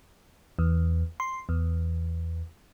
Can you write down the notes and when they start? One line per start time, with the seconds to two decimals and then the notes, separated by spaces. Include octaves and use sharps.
0.59 E2
1.20 C6
1.49 E2